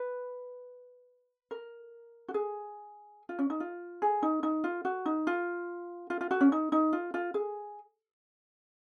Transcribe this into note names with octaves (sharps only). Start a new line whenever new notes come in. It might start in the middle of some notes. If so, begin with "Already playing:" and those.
Already playing: B4
A#4
F#4
G#4
F4
C#4
D#4
F4
G#4
D#4
D#4
F4
F#4
D#4
F4
F4
F4
F#4
C#4
D#4
D#4
F4
F4
G#4